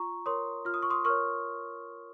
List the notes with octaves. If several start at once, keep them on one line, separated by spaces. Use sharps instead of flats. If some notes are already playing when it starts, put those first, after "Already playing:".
Already playing: F4 A#5 C#6
A#4 C#5 C6 D#6
F4 F6
D#6
C#6
C6 D#6
A#4 C#5 C#6 F6